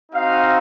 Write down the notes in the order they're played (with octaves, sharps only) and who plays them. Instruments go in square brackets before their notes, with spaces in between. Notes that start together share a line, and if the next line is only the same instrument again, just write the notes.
[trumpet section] C4 D#4 F#4 F5